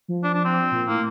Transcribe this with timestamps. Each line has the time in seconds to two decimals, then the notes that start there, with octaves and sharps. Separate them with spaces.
0.08 F3
0.24 D4
0.34 D4
0.45 C4
0.71 A#2
0.88 A2 A#3